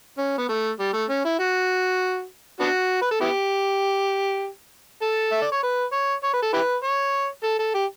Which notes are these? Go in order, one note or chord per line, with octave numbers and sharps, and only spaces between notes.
C#4
B3
A3
G3
A3
C#4
E4
F#4
B3 D4 F#4
B4
A4
B3 E4 G4
A4
E5
D5
C#5
B4
C#5
C#5
B4
A4
E4 G4 B4
C#5
A4
A4
G4